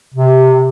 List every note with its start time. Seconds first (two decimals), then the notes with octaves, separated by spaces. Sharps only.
0.14 C3